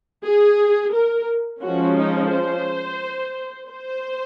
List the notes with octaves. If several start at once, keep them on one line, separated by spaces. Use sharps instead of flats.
G#4
A#4
F3 G#3 C#4 F#4
D#4
C5
C5